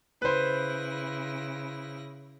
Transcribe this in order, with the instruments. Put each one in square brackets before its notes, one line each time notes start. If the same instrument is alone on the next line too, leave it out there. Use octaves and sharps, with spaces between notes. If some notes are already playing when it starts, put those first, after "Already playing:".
[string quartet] C#3 E4 A#6 [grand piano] B4 C5